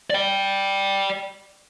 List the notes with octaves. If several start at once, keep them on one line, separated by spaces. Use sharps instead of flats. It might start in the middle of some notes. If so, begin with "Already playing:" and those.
D5 G5